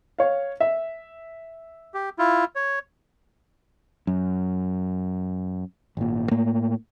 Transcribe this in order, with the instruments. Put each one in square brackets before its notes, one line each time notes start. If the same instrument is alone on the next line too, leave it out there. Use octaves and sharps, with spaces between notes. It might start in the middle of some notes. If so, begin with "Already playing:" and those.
[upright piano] C#5 F5
E5
[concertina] G4
E4 F4
C#5
[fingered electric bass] F#2
G#1 A#2
A2 A#3